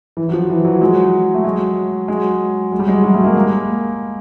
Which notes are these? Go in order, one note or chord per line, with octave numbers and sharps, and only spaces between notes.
E3
F#3
F3
E3
E3 F#3
F#3 G#3
A3
F#3 G#3
F#3 G#3
F#3 G#3
G3
F#3 G#3
F#3 G#3
G3 A3
G#3 A#3
G#3 A#3